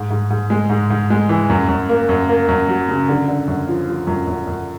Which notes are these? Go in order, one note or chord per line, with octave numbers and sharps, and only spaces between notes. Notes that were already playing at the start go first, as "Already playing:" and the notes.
Already playing: G#2
G#2
G#2
G#3
G#2
G#2
G#3
E3
F#2
F#2
A#3
F#2
A#3
F#2
F#3
C#3
D3
D3
F#2
F3
F3
F#2
F#2
F#2